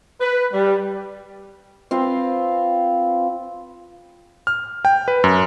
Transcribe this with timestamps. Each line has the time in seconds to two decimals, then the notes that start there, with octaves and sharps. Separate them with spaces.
0.21 B4
0.52 G3
1.91 C4 F4 B4 F5
4.47 F6
4.85 G5
5.08 B4
5.24 F#2